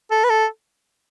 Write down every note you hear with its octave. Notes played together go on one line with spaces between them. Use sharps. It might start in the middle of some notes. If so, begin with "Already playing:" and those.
A4
B4
A4